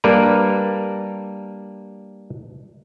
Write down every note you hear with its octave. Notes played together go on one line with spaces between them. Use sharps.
G3 A#3 D4 A#4 B4